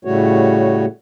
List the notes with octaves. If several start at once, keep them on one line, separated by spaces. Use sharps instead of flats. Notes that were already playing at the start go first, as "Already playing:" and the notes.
A2 C#3 G3 A3 F#4 C#5